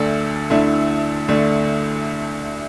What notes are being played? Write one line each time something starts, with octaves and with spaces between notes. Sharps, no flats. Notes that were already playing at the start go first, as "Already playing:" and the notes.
Already playing: D2 D3 A3 D4 A4
D2 D3 A3 D4 E4
D2 D3 A3 D4